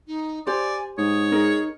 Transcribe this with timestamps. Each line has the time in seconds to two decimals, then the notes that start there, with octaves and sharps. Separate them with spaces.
0.07 D#4
0.47 G4 C5 D5 G#5
0.98 G#2 C#5 D#6
1.32 D#4 G#4 A#4 D#5